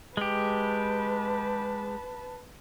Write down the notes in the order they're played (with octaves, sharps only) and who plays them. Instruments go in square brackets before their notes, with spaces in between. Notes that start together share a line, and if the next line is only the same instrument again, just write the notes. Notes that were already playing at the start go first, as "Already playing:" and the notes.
[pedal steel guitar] G#3 G4 [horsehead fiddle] B4 A5